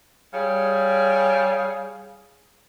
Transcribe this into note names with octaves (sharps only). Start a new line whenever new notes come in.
G3 G#4 C#5 F5